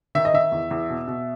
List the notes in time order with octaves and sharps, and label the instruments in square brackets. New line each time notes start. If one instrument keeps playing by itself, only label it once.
[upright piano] D#3 E5
D#5
D#3 E5
E2
E2
B2
B2